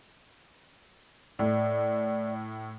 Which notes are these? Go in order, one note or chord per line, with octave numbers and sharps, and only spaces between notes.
A2 D5